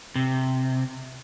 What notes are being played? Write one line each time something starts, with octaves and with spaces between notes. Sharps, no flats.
C3